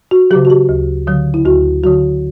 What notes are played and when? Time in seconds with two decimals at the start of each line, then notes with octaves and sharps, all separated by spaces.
0.11 F#4
0.31 C#3 F#3 G4
0.45 F#4
0.50 G4
0.69 D2
1.07 D3 F#3
1.34 E4
1.46 D2 F#4
1.83 D3 F#3 F#4